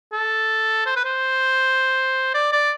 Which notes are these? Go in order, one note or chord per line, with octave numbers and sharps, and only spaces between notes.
A4
C5
B4
C5
D5
D5